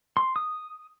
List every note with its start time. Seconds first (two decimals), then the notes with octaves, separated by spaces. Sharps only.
0.17 C6
0.36 D#6